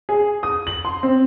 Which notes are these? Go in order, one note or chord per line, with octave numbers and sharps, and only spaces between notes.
G#4
D#6
F#7
C6
C4